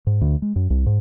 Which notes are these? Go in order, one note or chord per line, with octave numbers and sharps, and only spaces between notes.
G#2
D2
G#3
F#2
C2
G#2